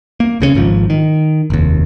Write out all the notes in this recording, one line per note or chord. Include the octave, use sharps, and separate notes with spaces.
A#3
C2 C#3 G3 C#4
G#1 G#2 F3
D#3
F1 D#2